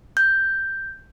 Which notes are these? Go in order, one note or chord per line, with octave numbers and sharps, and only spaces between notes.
G6